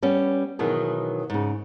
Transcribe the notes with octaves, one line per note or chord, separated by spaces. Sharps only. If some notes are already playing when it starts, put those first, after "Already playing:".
G3 B3 C#4
B2 D#3 E3 F#3 G#4
G#2 C#3